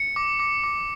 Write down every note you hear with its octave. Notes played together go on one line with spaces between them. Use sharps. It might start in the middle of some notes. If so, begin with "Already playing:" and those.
Already playing: C#7
D6
D6
D6